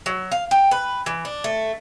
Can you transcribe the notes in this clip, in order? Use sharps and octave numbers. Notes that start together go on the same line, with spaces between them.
F#3
F5
G4
B4
E3
D4
A3